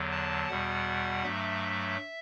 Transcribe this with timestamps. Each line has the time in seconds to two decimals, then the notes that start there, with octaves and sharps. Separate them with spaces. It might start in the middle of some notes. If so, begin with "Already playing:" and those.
Already playing: E2 D3 F#3
0.11 A5
0.48 E2 B2 G3 F#5
1.23 G2 F#3 A3 E5